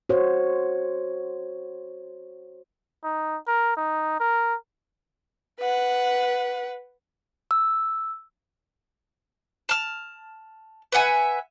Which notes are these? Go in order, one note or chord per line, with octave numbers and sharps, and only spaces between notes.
F#4 C5 C#5
D#4
A#4
D#4
A#4
B4 F#5
E6
A5 F6
B4 E5 F#5 G#5